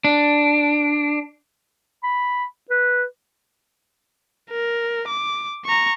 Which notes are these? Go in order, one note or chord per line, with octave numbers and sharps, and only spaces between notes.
D4
B5
B4
A#4
D6
A#5 C#6